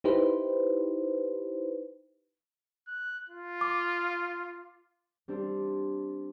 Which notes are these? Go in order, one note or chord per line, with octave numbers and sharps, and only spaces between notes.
D#4 E4 G4 B4 C5
F#6
F4
D6
G3 C4 D4 A4